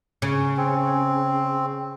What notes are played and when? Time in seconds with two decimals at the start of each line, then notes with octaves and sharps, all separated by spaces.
0.22 C#3
0.57 C4